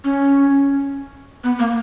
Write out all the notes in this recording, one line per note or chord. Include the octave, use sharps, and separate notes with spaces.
C#4
B3
A#3